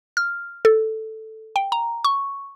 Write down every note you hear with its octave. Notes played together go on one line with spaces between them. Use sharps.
F6
A4
G5
A#5
C#6